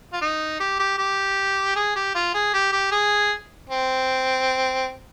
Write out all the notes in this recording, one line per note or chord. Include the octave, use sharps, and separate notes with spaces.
F4
D#4
G4
G4
G4
G#4
G4
F4
G#4
G4
G4
G#4
C4